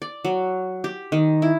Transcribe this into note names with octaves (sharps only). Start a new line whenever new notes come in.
D5
F#3
G4
D#3
E4